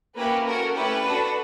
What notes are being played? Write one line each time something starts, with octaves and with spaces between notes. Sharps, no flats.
A#3 C#4 E4 G4 B4
C#4 F#4 A4 A#4
A3 C#4 E4 G4 B4
D4 F#4 A4